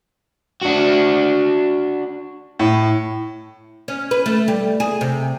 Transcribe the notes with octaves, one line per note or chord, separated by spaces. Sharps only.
D4 F#4
A2
C#4
B4
A3
G3
G#4
C3